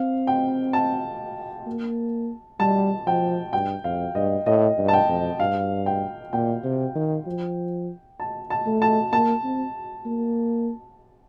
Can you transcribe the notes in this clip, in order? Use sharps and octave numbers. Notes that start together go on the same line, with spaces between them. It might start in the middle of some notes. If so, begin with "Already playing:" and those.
Already playing: C4 F5
G5
A5
A#3
G3 A5
F3 G5
G2 G5
F2 F5
G2 D#5
A2 D#5
G2
A5
G5
F2
G2 F5
G5
A#2 G5
C3
D#3
F3
A5
A5
A3
A5
A#3 A5
C4
A#3